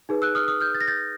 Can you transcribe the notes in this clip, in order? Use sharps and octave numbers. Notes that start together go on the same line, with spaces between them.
D#4 G#4 B4
E6 F#6
D#6 F6
D#6 F6
F6 G6
A6
A#6
G6 A6